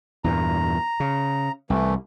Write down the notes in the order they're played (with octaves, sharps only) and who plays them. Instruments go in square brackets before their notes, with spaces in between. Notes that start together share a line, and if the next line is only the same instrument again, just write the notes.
[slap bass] E2 G2 A#2 [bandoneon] A#5
[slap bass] C#3
[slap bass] C2 [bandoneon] E3 A3